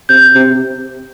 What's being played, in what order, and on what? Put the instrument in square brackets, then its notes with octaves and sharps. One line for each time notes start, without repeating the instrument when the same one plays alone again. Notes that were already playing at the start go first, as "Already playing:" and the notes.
[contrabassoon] C3 [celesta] G6
[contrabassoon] C3